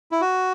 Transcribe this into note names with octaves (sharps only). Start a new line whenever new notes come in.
E4
F#4